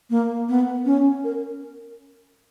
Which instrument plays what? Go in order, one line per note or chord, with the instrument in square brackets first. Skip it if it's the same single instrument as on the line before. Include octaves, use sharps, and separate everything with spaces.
[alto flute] A#3
B3
C#4
A#4